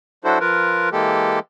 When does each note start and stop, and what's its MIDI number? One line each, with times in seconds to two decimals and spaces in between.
0.24 0.39 54
0.24 0.39 62
0.24 0.39 64
0.24 0.39 66
0.24 0.39 69
0.24 0.39 72
0.40 0.89 53
0.40 0.89 65
0.40 0.89 70
0.40 0.89 71
0.92 1.39 52
0.92 1.39 56
0.92 1.39 58
0.92 1.39 67
0.92 1.39 69